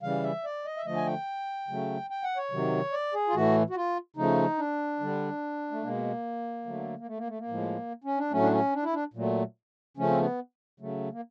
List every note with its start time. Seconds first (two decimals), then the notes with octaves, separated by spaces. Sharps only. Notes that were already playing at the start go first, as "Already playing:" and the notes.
0.02 C#3 E3 G3 F5
0.23 E5
0.44 D5
0.65 D#5
0.77 E5
0.86 D3 F3 A3 D#5
0.96 G#5
1.07 G5
1.68 C#3 F#3 A3
2.10 G5
2.23 F#5
2.37 C#5
2.51 C3 D#3 F#3
2.92 D5
3.14 G#4
3.28 F4
3.34 A2 E3 A3 F#4
3.70 F#4
3.76 F4
4.16 C#3 F3 A3 D#4
4.58 D4
5.00 D3 G3
5.71 A3
5.83 B2 G#3 A#3
6.66 D3 F#3 A3
6.99 A#3
7.07 A3
7.17 A#3
7.28 A3
7.38 A#3
7.48 A2 F3 G#3
8.04 C#4
8.18 D4
8.31 A2 F#3 A3 C#4
8.42 D4
8.52 C#4
8.73 D4
8.83 E4
8.93 D4
9.14 A#2 F#3 A3
9.97 C#3 F3 A3 C#4
10.09 C4
10.18 B3
10.80 C#3 F#3 A3
11.12 A#3